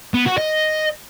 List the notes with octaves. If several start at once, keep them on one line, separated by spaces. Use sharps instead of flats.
B3
F#4
D#5